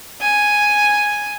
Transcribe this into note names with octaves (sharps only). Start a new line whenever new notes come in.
G#5